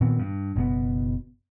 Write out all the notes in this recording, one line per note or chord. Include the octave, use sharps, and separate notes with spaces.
A#2 D#3 B3 C4
G2
F#1 B2 B3